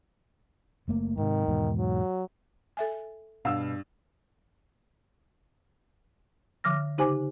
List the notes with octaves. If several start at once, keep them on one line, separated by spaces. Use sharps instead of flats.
F#1 A3 A#3
G#2 C3 D#3
E2 G#2 B2
F#3
A4 E5 G#5
G2 B2 F5 E6
D3 F3 D6 F6 A#6
C#3 D#4 G4 C5 G#5 D6